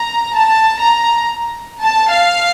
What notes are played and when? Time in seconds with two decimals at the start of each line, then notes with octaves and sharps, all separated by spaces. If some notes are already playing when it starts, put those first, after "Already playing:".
Already playing: A#5
0.34 A5
0.79 A#5
1.81 A5
2.10 F5